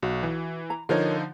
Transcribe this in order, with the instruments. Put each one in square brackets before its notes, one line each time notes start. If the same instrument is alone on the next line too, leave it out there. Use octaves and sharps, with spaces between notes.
[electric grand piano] B1 [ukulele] F#4
[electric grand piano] E3
[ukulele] A#5
[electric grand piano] D3 F3 D#4 [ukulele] A#4 C#5